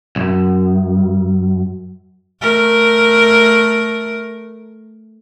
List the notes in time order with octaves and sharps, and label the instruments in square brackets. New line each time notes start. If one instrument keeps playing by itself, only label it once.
[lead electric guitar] C2 F#2
[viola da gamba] A3 A#4